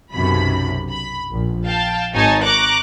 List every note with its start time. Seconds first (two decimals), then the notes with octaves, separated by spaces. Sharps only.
0.13 B1 F#2 C3 B5
0.91 B5
1.32 A#1
1.66 F5 G5 A5
2.13 G#1 D#4 C#5 G#5 A5
2.44 A#5 C#6 D6 F#6